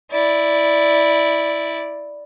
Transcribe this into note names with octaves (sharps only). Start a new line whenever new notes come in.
E4 D5